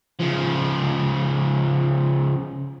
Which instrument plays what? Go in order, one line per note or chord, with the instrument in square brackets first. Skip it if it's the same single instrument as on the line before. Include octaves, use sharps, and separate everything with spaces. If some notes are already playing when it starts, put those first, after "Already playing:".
[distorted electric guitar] C#3 F3